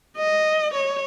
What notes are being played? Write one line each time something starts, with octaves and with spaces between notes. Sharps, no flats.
D#5
C#5